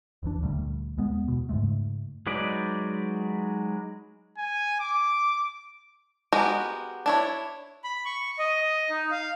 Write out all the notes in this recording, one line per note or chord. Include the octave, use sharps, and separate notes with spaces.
F1 D#2 E3 D4
D2 A#2 G3 A3
D#2 G#3 B3
E2 B2
G#2 C#3 G#3 A3
F#3 G#3 D#4 B4 D5
G#5
D6
G#3 B3 F#4 G4 A#4
D4 E4 C#5
B5
C#6
D#5
D#4
F5